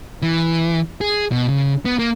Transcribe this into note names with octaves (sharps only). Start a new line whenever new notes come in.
E3
G#4
B2
C#3
B3
A#3